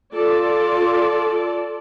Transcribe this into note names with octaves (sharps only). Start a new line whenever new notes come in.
F4 A4 D5